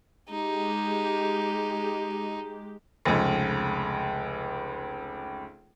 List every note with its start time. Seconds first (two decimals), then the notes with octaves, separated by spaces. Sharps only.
0.30 G#3 D#4 G4
3.05 F1 C#2